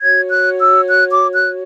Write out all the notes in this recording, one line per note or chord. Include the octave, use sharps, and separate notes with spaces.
F#4 C#5 G#6
F#6
E6
F#6
D6
F#6